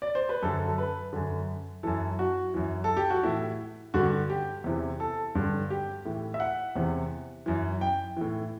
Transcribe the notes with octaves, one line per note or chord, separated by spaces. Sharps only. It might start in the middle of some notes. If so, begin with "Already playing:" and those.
D5
C5
B4
F#2 D3 A4
A4
B4
F#2 D3
F#2 E3 A4
F#4
F#2 E3
A4
G4
F#4
A2 E3 E4
G2 D3 F#4
G4
E2 C3 E3
A4
G2 D3
G4
A2 E3
E5
F#5
E2 C3 E3
F#2 E3
G5
A2 E3